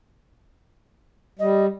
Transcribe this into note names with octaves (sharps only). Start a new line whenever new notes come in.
G3 D#5